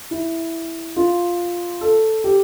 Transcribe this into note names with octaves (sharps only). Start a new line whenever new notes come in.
E4
F4
A4
G4